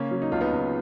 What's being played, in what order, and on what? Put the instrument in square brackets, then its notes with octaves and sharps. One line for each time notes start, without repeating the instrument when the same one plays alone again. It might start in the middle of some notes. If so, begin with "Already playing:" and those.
Already playing: [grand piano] C#3 A#3 C#4
F#3
D#4
C#2 F4
B3 D#4
C#2